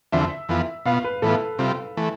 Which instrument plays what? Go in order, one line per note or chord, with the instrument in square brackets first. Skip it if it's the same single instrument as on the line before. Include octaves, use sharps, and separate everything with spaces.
[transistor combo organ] E2 D3 F3 C4 [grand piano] E5
[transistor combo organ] F2 E3 B3 F4
[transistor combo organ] B2 B3 F4 [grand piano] F5
[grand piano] B4
[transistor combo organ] A2 E3 B3 F4 [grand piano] A4
[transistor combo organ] C3 G3 C4 F4
E3 A3